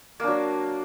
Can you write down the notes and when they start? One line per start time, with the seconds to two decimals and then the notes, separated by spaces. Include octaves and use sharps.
0.20 A#3
0.24 D4
0.27 F#3